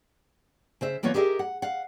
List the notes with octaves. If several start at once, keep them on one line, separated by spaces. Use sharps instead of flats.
C#3 C5 E5
E3 A#3 B3 F4 C#5
G4 G#4 A#4 D#5 E5
F#5
F5 F#5